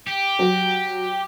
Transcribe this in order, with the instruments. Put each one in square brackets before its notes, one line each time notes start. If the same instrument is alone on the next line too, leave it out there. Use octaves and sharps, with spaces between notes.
[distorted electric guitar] G4
[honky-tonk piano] F#3